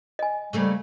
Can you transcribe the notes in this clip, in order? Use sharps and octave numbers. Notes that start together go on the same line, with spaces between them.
D#5 G#5
C#3 G3 A3 A#3